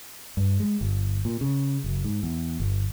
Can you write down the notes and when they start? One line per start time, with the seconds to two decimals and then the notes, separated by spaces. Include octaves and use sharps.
0.37 G2
0.60 G#3
0.81 G1
1.25 A#2
1.41 C#3
1.84 F#1
2.04 G#2
2.23 E2
2.60 G1